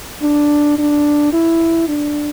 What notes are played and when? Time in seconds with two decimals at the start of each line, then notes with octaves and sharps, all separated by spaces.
0.23 D4
0.78 D4
1.33 E4
1.88 D4